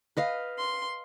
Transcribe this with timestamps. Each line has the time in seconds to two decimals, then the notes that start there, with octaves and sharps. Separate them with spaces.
0.17 B4 D#5 F5
0.58 C6